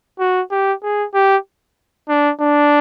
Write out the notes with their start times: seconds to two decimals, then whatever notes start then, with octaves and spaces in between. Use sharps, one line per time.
0.19 F#4
0.51 G4
0.83 G#4
1.14 G4
2.09 D4
2.41 D4